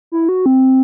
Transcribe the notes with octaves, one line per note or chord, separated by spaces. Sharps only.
E4
F#4
C4